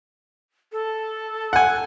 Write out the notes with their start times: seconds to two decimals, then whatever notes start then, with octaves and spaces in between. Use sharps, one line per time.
0.72 A4
1.53 F#5 G#5